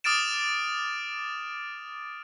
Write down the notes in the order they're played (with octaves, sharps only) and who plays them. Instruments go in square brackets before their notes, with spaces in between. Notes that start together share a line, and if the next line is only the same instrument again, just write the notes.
[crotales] D6 D#6 F6 A6 D7 E7